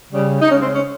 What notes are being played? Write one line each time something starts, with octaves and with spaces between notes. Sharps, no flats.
C#3 G3
D#4
C#3 G#3 C#4
C4
C#4